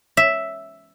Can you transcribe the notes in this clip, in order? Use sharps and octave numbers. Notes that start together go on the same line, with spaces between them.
E5